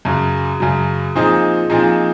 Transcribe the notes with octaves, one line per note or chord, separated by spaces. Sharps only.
F#2 C#3 F#3
F#2 C#3 F#3
A#2 F3 C4 D#4 G#4
A#2 F3 C4 D#4 G#4